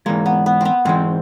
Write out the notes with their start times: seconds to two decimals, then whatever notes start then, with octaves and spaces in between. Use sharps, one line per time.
0.06 G#2 E3 G#3 A#3
0.26 B3
0.46 B3
0.61 B3 C4
0.85 G#2 E3 G#3 C4